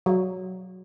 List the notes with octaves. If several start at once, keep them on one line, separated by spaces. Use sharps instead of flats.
F#3